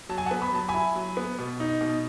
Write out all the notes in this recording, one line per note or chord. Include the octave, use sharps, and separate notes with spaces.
F#3 A5
G#5
F#5 A5
B3
B5
F#3 A5
G#5 B5
E4
F#3
B3
B2
D#4
B2